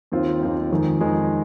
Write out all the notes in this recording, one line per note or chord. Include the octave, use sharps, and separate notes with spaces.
D#2 D#3 C4 F4
D#2 D#3 C4 F4
F2 D#3 G#3
F2 D#3 G#3